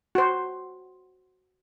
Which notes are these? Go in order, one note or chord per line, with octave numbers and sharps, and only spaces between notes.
F#4 C5